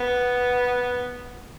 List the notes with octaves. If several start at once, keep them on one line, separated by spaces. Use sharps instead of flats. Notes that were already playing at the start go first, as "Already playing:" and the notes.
Already playing: B3